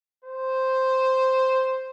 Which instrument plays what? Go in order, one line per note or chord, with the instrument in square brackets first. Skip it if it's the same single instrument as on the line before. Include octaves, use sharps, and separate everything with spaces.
[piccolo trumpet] C5